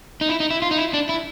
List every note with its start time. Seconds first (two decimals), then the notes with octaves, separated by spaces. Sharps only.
0.21 D#4
0.29 E4
0.40 D#4
0.50 E4
0.62 F4
0.71 D#4
0.78 E4
0.94 D4
1.09 E4